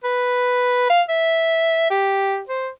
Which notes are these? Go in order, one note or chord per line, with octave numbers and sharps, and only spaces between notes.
B4
F5
E5
G4
C5